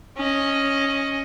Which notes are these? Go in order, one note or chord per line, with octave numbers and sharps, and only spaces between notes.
C#4 D#5